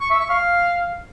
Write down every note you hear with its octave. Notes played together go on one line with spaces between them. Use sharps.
C#6
E5
C#6
F5